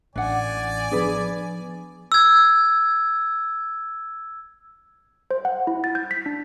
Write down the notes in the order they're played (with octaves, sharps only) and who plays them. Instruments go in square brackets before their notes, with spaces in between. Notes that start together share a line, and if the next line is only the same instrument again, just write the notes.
[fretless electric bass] A1 [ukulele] D4 F#5 [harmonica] D5 G#5
[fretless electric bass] F3 B3 D4 [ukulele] G#4 B4
[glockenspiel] E6 G#6
[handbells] C5
F#5
E4
A6
G6
B6
D4